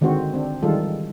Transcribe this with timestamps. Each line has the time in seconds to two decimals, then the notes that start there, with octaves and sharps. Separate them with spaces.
0.01 D3 D#3 G#3 C4 F#4 C5
0.34 C4 D4
0.62 D#3 E3 G3 G#3 F4 A4